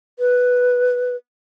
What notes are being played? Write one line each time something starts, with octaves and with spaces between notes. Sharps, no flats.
B4